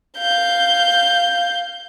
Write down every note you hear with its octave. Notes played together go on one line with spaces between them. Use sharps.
F5 G6